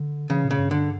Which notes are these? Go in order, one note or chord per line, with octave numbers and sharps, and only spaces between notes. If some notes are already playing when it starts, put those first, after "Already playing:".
Already playing: D3
C#3 E3
A#2
C#3
G2
D3